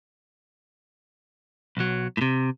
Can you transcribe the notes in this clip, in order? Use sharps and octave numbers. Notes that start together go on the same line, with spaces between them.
B1 F#3
A2 C3